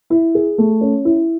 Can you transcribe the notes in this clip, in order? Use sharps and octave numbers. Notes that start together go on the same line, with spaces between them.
E4
G#4
A3
C#4
E4